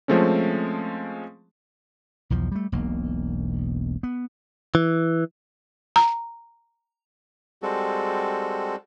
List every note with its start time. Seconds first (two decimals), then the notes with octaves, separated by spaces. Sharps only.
0.08 F3 G#3 A3 C4 C#4
2.30 B1 E2 F3
2.52 G3 A3
2.72 E1 B1 A#3
4.03 B3
4.75 E3
5.96 A#5
7.62 G3 G#3 C4 F#4 A4